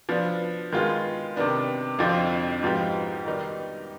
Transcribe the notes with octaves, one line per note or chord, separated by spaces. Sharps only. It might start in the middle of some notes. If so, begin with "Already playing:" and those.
F3 B3 D4
D#3 G#3 B3 F4
C3 D#3 B3 D4
F2 D3 F3 C4 D#4
G#2 F3 B3 D#4 G4
D#3 G3 B3 D#4